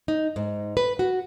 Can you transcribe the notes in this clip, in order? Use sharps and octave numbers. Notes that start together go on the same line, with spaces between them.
D#4
G#2
B4
F#4